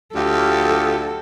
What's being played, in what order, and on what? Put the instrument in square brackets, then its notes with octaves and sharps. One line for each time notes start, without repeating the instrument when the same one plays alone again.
[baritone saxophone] D2 [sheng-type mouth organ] F4 G4 [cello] A4